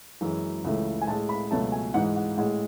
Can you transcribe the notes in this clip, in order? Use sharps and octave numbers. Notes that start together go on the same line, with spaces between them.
F#2 E3 G#3
C#2 C#3 E3 A3
G#5
A2 G#3 A5
B5
C#2 B2 F#3 A3 A5
G#5
G#2 E3 G#3 F#5
F#5
A2 G#3 F#5